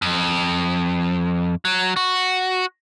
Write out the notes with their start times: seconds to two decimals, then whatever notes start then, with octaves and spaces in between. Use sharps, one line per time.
0.02 F2
1.65 F#3
1.96 F#4